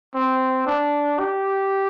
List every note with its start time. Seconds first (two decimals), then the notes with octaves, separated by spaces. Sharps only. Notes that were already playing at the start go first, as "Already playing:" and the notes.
0.15 C4
0.66 D4
1.19 G4